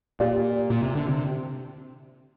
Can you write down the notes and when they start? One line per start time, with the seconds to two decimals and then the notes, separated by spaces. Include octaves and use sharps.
0.20 A#2 G4 D5 F5
0.70 A#2
0.83 C3
0.96 D3
1.09 C3